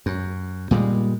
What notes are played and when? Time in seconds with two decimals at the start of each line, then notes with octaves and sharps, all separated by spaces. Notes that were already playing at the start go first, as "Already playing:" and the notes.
0.06 F#2
0.71 A#2 G3 G#3